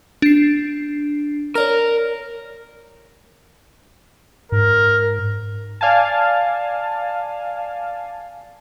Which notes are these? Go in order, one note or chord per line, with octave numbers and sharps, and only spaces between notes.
D4 C7
A#4 C#5 D5 F6
G#2 A#4
D5 F5 G#5 A5